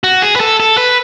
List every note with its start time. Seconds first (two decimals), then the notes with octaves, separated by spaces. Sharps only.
0.04 F#4
0.22 G#4
0.36 B4
0.40 A4
0.60 A4
0.77 B4